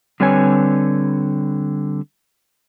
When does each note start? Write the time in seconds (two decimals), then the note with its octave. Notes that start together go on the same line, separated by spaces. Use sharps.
0.20 D3 G3 C4 B4 C#5 G#5